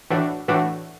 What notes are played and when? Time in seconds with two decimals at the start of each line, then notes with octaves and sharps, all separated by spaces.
0.10 A2 E3 A3 D4 F#4
0.48 A2 E3 A3 D4 F#4